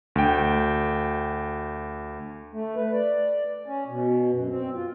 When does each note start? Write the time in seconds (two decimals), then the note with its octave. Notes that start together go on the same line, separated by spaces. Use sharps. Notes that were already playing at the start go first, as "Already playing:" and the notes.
0.16 D2 G5
2.53 A3
2.76 B4
2.92 D5
3.67 C#4
3.88 B2
4.32 F#2
4.49 C4
4.75 F4